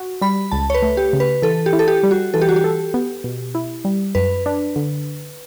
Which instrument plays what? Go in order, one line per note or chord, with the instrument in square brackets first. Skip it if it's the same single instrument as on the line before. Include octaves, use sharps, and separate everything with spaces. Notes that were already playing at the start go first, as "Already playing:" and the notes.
Already playing: [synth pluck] F#4
[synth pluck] G3 [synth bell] B5
[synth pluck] C#2 [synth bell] A5
[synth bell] C#5
B4
[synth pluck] A3
[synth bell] G4
[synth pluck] C#3
[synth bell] B4
[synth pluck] E3 [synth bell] A4
[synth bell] G4
[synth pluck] E4
[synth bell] A4
G4
[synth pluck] G3
[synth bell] F#4
[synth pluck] E3 [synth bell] A4
[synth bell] G4
F#4
G4
[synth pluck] A4
B3
B2
E4
G3
[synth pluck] F#2 [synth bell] B4
[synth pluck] D4
D3